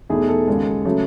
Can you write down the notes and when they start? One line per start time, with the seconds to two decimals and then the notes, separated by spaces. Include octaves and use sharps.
0.09 E2 B2 A3 D#4 G#4
0.29 A4
0.48 D#2 C#3 G#3
0.85 C#3 F#3 A3